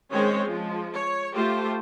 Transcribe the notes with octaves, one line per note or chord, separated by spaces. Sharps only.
D#3 G#3 C4 C#4 C5 C#5
F3 G#3
C#5
A3 F4 G4 C5